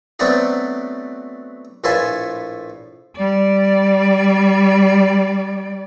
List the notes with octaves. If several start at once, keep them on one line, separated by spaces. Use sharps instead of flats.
F#3 A3 B3 C4 D4 F#4
A#1 A2 F4 A4 B4 G#5
G3 D5